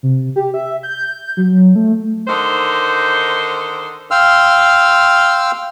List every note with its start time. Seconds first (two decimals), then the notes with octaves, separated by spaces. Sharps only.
0.03 C3
0.36 G4
0.54 E5
0.83 G6
1.37 F#3
1.76 A3
2.28 D3 D#3 D#4 C5
4.11 F5 G5 C6 E6 F6